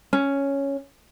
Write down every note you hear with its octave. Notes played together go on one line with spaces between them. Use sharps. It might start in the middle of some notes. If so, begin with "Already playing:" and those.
C#4